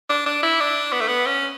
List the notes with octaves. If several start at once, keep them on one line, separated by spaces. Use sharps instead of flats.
D4
D4
E4
D4
B3
A3
B3
C#4